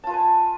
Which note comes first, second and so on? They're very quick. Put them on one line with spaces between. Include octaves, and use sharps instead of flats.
A5 F4 B4 G#5